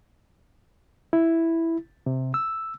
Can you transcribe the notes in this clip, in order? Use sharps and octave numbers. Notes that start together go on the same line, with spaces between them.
E4
C3
E6